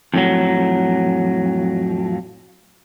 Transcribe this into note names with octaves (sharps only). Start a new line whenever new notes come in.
F2 A2 F#3